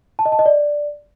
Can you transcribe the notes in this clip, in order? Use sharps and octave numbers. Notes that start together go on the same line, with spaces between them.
A5
D#5
A5
D#5
D5